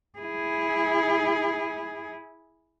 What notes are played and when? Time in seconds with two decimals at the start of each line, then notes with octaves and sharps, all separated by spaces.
0.19 E4 G#4